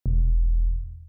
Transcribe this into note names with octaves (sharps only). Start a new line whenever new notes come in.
E1